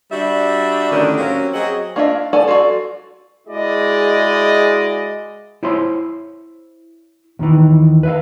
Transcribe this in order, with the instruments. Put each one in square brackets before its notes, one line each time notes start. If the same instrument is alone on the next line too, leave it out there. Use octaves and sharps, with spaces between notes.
[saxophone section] G3 D4 F#4 D5 E5
A2 D3 D#3 C#4 D4
F#3 A#3 C4 C#4 G4
F#3 C4 F#4 G#4 D#5
[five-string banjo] A#3 D4 F4 D#5 E5
A4 D5 F#5 G#5 A5
F4 F#4 A4 D5
[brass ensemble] G#3 E4 F#4 G#4 D5 D#5
[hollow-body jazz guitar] E4 C5 C#5 E5 C6
D#2 D#3 E3
B4 E5 F5